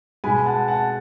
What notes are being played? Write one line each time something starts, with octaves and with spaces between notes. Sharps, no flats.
B2 G#3 G#5 B5
F#5 A5
F#5 A5